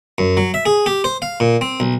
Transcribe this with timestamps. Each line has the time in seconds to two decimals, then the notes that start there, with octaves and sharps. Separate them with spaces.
0.18 F#2
0.37 F#3
0.54 E5
0.66 G#4
0.86 G4
1.04 C5
1.22 F5
1.40 A#2
1.61 C4
1.80 B1